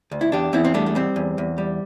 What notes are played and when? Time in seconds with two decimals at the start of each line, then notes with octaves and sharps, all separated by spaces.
0.11 D2
0.21 E4
0.32 E2 D4 G4
0.53 E2 C4 E4
0.65 C4
0.74 G3 A3 D4
0.86 A3
0.95 G3 C4
1.16 E2
1.38 E2
1.58 G3